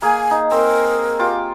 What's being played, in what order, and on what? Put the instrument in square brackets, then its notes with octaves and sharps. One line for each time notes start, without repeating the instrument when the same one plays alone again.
[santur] A#3 G#4 [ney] G#5
[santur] D#4
[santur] C4 [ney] A#4
[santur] F4 G4 D6